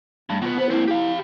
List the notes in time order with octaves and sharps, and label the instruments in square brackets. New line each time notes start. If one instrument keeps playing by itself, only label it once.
[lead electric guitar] G2 [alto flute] A3
[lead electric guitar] B2 B3 [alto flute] F4
[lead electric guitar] B3 [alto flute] C5
[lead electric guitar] A#3 C4 [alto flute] E4
[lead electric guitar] G4 F5